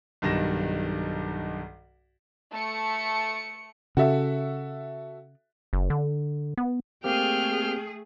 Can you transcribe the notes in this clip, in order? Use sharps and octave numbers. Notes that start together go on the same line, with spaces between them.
B1 G2 D#3 A#6 E7
A3 C#7
C#3 F#4 A4 E5
F#1
D3
B3
A3 A#3 C4 G4 G#4 G5 F6